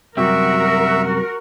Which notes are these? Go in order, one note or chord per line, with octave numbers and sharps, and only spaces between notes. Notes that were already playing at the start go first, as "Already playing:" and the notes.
F#2 C3 G3 F#4 A#4 E5